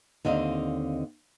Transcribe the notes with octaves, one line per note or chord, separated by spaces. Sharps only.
D#2 D3 C4 D#5 F5